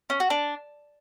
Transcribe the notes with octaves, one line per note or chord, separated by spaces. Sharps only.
C#4
F#4
D4